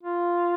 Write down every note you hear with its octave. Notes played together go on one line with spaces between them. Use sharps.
F4